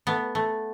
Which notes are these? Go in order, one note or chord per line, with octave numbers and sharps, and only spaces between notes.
A3 B3
A3